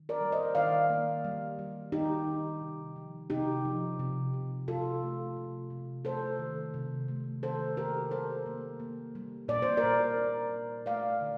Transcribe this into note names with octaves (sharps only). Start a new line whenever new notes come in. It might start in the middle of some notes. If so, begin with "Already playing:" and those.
Already playing: D#3
A#4 D5
G3
C5 D#5
D#3 D5 F5
A#3
G3
G3
D#3 D#4 G4
D#3
C3
F3
C3 D#4 G4
F3
C3
C3
C3 F4 A4
A3
C3
C3
A3 A4 C5
D#3
C3
A3
D#3 A4 C5
C3 G4 A#4
G3 A4 C5
A#3
A#3
G3
A#2 D5
C5
A#4 D5
A#2
A#2
G3
A3 D5 F5
D3